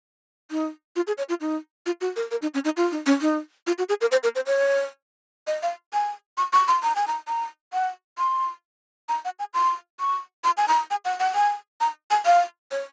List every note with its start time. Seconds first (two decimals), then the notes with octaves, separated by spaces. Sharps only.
0.51 D#4
0.96 F4
1.07 G#4
1.18 C#5
1.29 F4
1.41 D#4
1.86 F4
2.01 F#4
2.16 A#4
2.31 A#4
2.42 D#4
2.54 C#4
2.65 D#4
2.77 F4
2.92 D#4
3.06 C#4
3.21 D#4
3.67 F4
3.78 F#4
3.89 G#4
4.01 A#4
4.12 C5
4.23 A#4
4.35 C5
4.46 C#5
5.47 D#5
5.63 F5
5.93 G#5
6.38 C#6
6.53 C#6
6.68 C6
6.83 A#5
6.96 G#5
7.07 A#5
7.28 A#5
7.73 F#5
8.18 C6
9.09 A#5
9.25 F#5
9.39 G#5
9.54 C6
10.00 C#6
10.44 C6
10.58 G#5
10.68 A#5
10.91 G#5
11.05 F#5
11.20 F#5
11.35 G#5
11.81 A#5
12.11 G#5
12.26 F5
12.71 C#5